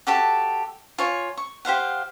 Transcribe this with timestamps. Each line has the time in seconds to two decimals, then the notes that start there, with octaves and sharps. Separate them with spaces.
0.07 F#4 G4 A4 A5
0.98 F4 C#5 G#5
1.37 C#6
1.65 G4 C5 F5 F#5